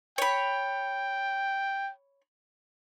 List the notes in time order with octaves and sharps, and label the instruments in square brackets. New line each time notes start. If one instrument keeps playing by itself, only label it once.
[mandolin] C#5 B5 [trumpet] G5